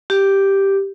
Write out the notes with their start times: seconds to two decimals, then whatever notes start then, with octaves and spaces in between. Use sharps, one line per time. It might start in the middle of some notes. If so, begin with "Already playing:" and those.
0.10 G4